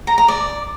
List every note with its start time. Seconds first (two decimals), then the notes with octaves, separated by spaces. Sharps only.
0.07 A#5
0.18 A#5
0.28 D5